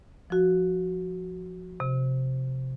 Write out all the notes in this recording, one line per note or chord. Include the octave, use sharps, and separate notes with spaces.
F3 F#4
C3